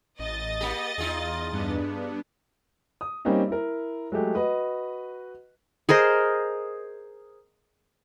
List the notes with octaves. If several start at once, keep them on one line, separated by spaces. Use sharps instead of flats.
A1 D#5 A6
A#3 G4
E2 D#4 F4 G#4
G2 B3 D4
D#6
G3 A#3 C4 C#4 D#4
E4 A#4
F#3 G#3 A3 G4
F#4 B4 D#5
G#4 A#4 C5 D#5